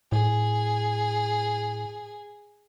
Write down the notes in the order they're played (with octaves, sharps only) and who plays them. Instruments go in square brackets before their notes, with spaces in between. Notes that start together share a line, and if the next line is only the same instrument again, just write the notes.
[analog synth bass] A2 [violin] G#4